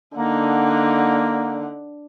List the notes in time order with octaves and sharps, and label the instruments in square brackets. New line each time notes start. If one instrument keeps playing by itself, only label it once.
[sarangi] D3 [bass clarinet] A#3 [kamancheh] D#4 F#5